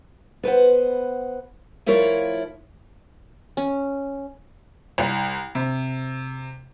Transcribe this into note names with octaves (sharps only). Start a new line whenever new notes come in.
B3 B4 C5 F#5
F3 A3 E4 F4 A#4 C#5
C#4
C2
C3